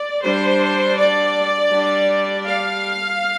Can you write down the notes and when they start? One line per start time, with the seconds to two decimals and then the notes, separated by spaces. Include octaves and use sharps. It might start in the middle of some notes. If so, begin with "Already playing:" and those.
Already playing: D5
0.24 G3 D4 C5
0.98 D5
1.72 G3 D4
2.46 F5